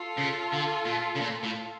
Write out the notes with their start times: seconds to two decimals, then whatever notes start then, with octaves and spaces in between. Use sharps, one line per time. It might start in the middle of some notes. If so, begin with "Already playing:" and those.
Already playing: F4 A4
0.17 C#3
0.52 D3
0.85 A#2
1.15 C#3
1.20 A#2
1.43 A2